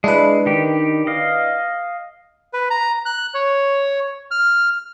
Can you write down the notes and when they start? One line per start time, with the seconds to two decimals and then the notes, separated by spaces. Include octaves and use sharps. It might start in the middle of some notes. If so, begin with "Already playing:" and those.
0.04 G#3 D4 E4 B4
0.46 D#3 G4
1.07 D#5 F5
2.53 B4
2.70 A#5
3.05 F#6
3.34 C#5
4.31 F6